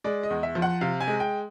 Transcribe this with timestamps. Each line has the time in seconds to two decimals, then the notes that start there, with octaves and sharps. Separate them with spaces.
0.04 G#3 D5
0.23 D#5
0.30 E2
0.43 E5
0.55 F3
0.62 F#5
0.81 C3 F5
1.01 G#5
1.07 G#3
1.20 G5